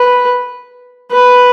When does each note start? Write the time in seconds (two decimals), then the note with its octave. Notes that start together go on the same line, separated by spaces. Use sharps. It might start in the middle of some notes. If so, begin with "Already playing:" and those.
Already playing: B4
1.11 B4